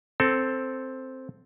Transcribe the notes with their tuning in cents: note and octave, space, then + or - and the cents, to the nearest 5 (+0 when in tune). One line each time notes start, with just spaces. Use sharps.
C4 +0 A4 +5